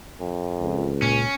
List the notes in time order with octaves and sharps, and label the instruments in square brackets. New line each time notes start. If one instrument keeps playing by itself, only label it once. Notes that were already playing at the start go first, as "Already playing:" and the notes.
[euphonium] F2
[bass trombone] C#2
[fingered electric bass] A#2 [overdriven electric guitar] C#4